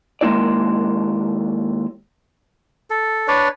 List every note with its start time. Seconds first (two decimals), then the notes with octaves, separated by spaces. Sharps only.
0.21 D#2 G#3 A#3 E4 D5
2.90 A4
3.28 D4 B4 C#5 D5